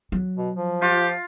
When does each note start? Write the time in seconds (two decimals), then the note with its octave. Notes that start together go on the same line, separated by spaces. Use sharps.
0.12 F#3
0.37 B2
0.55 F3
0.82 F4 G4